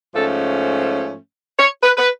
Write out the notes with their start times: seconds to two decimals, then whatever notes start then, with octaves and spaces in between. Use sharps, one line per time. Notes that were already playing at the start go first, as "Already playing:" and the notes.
0.14 G#2 F3 A3 C#4 A4
1.59 C#5
1.83 B4
1.97 B4